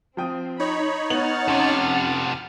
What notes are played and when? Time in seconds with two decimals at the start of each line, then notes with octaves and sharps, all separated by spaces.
0.17 F3 C4 G5 D#6
0.59 D#4 C#5 B5
1.10 B3 F#5 F6 A6 F#7
1.48 F2 C3 C#4